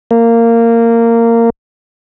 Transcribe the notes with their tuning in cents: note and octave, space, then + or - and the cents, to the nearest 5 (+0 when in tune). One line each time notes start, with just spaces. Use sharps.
A#3 -15